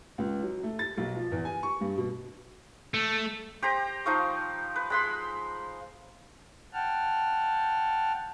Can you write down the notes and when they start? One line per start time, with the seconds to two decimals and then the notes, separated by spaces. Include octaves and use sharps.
0.18 C#2
0.43 F#3
0.63 A3
0.79 A6
0.98 B1
1.16 F3
1.32 E2
1.45 G#5
1.63 C#6
1.81 G2
1.97 B2
2.94 A3
3.62 G4 C5 A#5
4.06 F3 D#4 F5 C#6
4.76 B4
4.90 G#3 B5 C6
6.73 F#5 G5 A5 F6